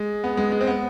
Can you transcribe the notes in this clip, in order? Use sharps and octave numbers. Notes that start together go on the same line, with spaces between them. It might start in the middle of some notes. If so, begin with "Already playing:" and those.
Already playing: G#3
B3
G#3
G#3
C4
B3